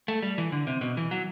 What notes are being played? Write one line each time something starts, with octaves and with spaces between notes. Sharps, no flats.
A3
G3
E3
D3
C3
B2
E3
F#3